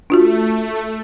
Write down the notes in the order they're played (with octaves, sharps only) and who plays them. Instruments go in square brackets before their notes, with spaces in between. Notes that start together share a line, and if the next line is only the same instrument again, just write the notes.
[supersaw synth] A3 [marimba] D4 F4 F#4